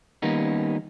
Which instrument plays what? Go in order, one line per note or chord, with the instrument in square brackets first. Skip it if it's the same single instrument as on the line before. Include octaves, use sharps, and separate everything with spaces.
[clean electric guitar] D#3 G3 A#3 B3 C#4 D#4